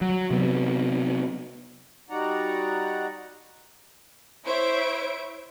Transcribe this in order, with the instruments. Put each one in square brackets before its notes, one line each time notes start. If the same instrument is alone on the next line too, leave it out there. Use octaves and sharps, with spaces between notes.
[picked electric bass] F#3
C3 F#3 B3
[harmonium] G3 D#4 F#4 D5 F#5 A#5
[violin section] E4 C5 C#5 E5 D7